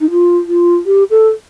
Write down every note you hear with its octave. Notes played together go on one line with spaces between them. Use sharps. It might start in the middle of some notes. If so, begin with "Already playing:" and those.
D#4
F4
F4
G4
A4